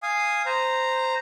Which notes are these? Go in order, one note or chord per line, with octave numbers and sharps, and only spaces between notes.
F5 G#5 D#6
C5 A#5